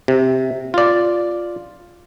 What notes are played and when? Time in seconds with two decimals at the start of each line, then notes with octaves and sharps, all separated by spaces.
0.08 C3
0.74 F4 D5